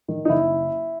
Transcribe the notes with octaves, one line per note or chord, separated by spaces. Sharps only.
D#3
D#4
F#1 E4